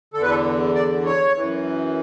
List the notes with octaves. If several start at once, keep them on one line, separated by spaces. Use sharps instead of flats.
E2 D3 A4
B4
A4
D5
C#5
F#2 E3